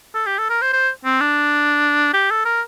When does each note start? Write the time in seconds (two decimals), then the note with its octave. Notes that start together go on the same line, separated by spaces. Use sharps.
0.14 A4
0.26 G4
0.38 A4
0.50 A#4
0.62 C5
0.73 C5
1.04 C4
1.20 D4
2.14 G4
2.30 A4
2.45 A#4